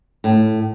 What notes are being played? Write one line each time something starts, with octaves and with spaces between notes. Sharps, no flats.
A2